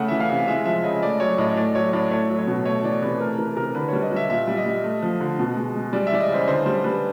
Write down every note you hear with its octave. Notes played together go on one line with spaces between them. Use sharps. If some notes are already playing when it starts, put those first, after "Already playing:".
Already playing: C#3 A3 F#5
E3 E5
F5
C3
G#3 E5
F3 E5
C#3 D#5
A3 D5
F#3 C#5
A2 D#5
A3 D5
F#3 C#5
A2 D5
A3 C#5
F#3
C#5
B2
A3 C#5
E3 D5
C3 B4
A3 A#4
E3 A#4
C3 A#4
D3 B4
G3 C#5
D#5
G3 E5
A#2 E5
G3
D#5
G3
A3
F3
D3
B2
G#3
G#3
G3 D5
E5
E3 D5
D#5
C#3 C5
D3 C5
G3 C5
G3 B4